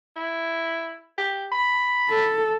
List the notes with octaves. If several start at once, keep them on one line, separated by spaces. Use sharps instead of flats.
E4
G4
B5
A4